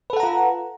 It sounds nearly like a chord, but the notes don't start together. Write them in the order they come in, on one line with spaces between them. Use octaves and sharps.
B4 A4 F#5 A#5 F4